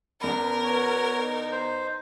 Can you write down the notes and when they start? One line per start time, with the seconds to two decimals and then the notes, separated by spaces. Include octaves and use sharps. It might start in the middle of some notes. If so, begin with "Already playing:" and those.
0.21 E2 C#4 D4 A#4 B5
0.63 F#4 B4 C#5
1.17 D#4
1.52 C5